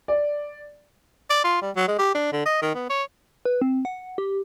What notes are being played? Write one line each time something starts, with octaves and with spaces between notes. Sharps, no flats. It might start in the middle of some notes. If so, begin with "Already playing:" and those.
D5
D5
F4
G3
F#3
G#3
G4
D4
D3
D#5
D#3
B3
C#5
B4
C4
F#5
G4